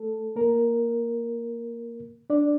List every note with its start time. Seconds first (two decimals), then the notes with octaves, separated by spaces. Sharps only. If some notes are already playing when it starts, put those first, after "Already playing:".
Already playing: A3 A4
0.36 A#3 A#4
2.30 D4 D5